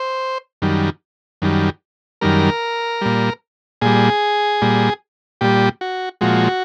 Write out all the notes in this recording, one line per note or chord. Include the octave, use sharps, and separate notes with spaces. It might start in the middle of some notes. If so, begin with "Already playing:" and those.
Already playing: C5
F#2 D#3 G3
F#2 D#3 G3
F#2 D#3 G3 A#4
A#2 G3
A#2 G3 G#4
A#2 G3
A#2 G3 G4
F#4
A#2 F3 G#3 F#4